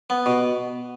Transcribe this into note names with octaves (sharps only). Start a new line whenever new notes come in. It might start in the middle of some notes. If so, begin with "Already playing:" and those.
B3
B2